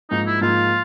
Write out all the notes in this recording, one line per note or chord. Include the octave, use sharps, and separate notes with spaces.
G#2 F3 A#3 D#4
E4
G#2 F3 A#3 F4